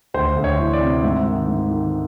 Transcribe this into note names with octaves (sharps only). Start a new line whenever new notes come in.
D2 C5
D2
C#5
E3
D5
C3
G#2 E5
D#3
G#2
D#3